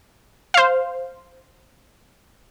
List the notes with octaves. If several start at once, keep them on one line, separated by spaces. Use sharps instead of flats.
C5 F5